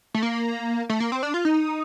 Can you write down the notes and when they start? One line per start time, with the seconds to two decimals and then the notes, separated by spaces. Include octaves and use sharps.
0.14 A3
0.23 A#3
0.90 A3
1.00 A#3
1.12 C4
1.23 D4
1.34 F4
1.45 D#4